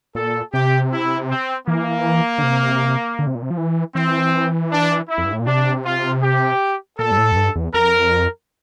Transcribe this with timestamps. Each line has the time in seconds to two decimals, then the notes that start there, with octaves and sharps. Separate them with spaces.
0.15 A#2 A4
0.53 C3 G4
0.92 E4
1.29 C4
1.68 E3 A#3
2.38 D3
2.43 C3
3.19 D3
3.27 C3
3.35 A#2
3.42 C3
3.50 F3
3.57 E3
3.95 E3 C4
4.71 D4
5.09 E4
5.18 F2
5.25 G2
5.33 A2
5.40 A#2
5.46 C3 D4
5.85 F4
6.23 G4
6.99 A#2 A4
7.11 G2
7.18 A2
7.32 F2
7.36 G2
7.56 E2
7.74 F2 A#4